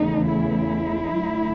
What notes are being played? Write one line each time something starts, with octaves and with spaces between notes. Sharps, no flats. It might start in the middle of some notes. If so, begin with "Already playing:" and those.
Already playing: E2 C#3 E3 A3 D#4
E4
F#2 D3 F#3 A3